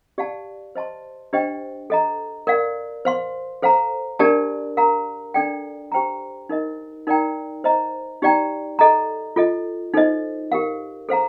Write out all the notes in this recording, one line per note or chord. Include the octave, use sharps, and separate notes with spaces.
G4 D5 F5 A5
C5 D#5 A5 C6
D4 G4 C5 D#5 G5
A4 D#5 A#5
A#4 D5 F5
C5 F5 C6
A4 C5 F5 A#5
D4 G4 A#4 D5 A5
A#4 F5 A#5
D4 A4 D5 G5
G4 C5 G5 A#5
D#4 A#4 D#5
D#4 A#4 D5 G5 A#5
C5 D#5 A#5
D#4 G4 D5 G5 A#5
A4 D#5 A#5
F4 A4 D#5
D#4 A4 C5 D#5
G4 A#4 F5
A4 C5 F5 A#5